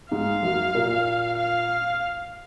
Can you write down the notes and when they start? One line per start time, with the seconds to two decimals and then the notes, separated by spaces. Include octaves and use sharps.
0.11 G#2 G#3 F5
0.43 F#2 F#3
0.75 A#2 A#3
1.37 F5